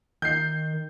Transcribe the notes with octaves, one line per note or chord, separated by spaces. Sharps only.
D#3 G6 C7